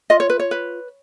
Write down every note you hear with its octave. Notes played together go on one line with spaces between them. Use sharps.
F4 D#5
C#5
B4
C#5
B4